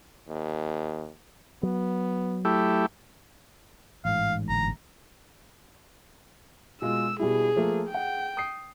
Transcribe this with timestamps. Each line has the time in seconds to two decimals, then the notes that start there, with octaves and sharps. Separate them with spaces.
0.29 D#2
1.63 F#3 B3
2.45 A3 E4 G4
4.05 A1 G#2 F5
4.49 G1 A#5
6.82 B2 G#3 F4 E6
7.20 B2 G3 E4 G#4
7.56 F3 A3 A#3
7.90 G#4 F#5 G5
8.37 D#6 C7